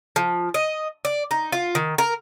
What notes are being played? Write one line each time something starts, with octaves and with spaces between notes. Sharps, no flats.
F3
D#5
D5
D#4
F4
D#3
A#4